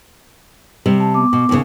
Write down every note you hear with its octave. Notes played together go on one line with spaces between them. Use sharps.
C3 G3
A5
B3 D6
B2
D#2 A2 C#3